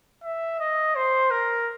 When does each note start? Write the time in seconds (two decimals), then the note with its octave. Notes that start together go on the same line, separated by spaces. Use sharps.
0.24 E5
0.60 D#5
0.95 C5
1.31 A#4